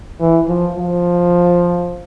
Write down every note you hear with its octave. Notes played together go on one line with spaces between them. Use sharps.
E3
F3
F3